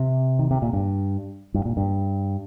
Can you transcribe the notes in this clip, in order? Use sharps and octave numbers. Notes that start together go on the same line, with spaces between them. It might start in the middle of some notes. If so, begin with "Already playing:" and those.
Already playing: C3
D#3
C3
A#2
G2
G2
A#2
G2